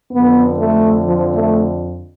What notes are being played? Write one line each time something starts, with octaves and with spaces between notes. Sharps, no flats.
F2 D3 B3
A3
F3
A3